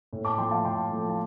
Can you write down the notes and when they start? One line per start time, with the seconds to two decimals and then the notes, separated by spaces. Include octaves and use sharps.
0.13 A2
0.25 A5 D6
0.38 F3 A3 G5 C6
0.51 F5 A5
0.65 A2 G5 C6
0.91 F3 A3
1.09 A5